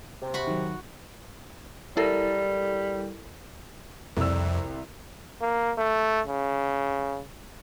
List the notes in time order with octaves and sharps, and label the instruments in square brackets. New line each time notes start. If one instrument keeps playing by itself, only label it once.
[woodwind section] C3
[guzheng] F#4 B5
[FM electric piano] D#3 F#3
[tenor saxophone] G3 [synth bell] E4 A4 A#4
[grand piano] C2 D5 E6 [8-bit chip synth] F2
[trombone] A#3
A3
C#3